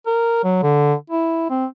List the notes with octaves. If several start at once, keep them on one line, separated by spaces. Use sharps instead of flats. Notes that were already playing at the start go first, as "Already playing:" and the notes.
A#4
F#3
D3
E4
C4